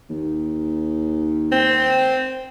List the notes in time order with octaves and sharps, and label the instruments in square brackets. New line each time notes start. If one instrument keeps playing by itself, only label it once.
[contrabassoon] D#2
[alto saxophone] C4